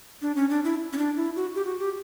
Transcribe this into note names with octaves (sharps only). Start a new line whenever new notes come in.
D4
C#4
D4
E4
C#4
D4
E4
F#4
G4
F#4
G4